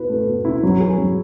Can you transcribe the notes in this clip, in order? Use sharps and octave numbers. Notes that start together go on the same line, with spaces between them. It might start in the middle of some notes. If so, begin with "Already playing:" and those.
Already playing: B2 E4 B4
A3
B2
E4
F#3
G#4
F#3